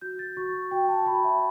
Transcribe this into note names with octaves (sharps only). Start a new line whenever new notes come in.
F#4 G6
A6
F#4 C#6
F#4 G5
A5
F#4 B5
E5